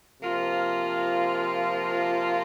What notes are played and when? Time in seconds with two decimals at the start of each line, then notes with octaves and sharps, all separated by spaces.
0.21 C3 F3 A#3 F4